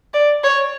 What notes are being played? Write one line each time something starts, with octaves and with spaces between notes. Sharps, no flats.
D5
C#5